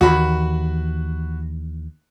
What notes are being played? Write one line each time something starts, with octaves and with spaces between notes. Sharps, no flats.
D#2 E3 F#4 B5